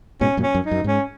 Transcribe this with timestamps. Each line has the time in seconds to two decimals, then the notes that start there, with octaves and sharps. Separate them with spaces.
0.21 G#2 B2 C#4
0.37 F#2 A#2
0.43 C#4
0.55 F#2
0.66 D#4
0.71 F#2
0.84 G#2 C#4